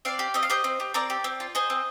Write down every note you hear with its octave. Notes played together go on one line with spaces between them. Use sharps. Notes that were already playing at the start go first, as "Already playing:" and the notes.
C4 D5 F5
G4
C4 D#5
F5
G4 C5 D#5
C4
G4
C4 A#4 D5
G4
C4
F4
G#4 C5 D#5
C4